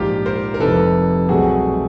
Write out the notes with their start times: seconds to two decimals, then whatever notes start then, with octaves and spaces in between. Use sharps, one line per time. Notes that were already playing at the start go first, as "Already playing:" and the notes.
Already playing: A#1 G#2 F3 A#3 F4 G4
0.26 A#4 C5
0.54 A#4
0.60 F1 F2 C3 D#3 A4 B4
1.29 C2 B2 F#3 A3 C4 F#4 G#4